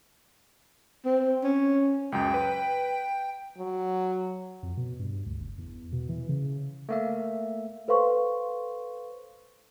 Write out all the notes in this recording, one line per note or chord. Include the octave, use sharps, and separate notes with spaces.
C4
C#4
C#2 F#2 G5
B4
F#3
F2
B2
G2
D2
F#1
E2
B2
E3
C#3
A3 A#3 E5
A4 B4 C5 F5 C6 C#6